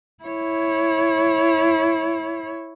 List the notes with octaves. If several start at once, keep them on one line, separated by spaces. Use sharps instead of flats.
E4 C#5